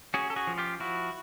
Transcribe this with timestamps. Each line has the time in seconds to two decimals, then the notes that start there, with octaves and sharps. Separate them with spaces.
0.14 C#4 F#4 G#4
0.30 A4
0.36 F#4 G#4
0.47 F3
0.58 F4 G4
0.80 F3 E4 F#4